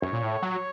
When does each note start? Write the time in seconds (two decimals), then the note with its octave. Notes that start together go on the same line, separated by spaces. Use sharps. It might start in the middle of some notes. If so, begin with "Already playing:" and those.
0.02 F#2 C#5
0.13 A#2
0.23 A2
0.42 F#3